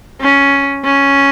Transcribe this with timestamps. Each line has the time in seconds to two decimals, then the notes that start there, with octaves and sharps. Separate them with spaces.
0.21 C#4
0.85 C#4